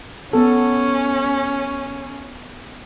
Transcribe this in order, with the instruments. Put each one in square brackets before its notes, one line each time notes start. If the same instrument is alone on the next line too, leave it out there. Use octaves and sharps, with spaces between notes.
[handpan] B3 A4 [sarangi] C#4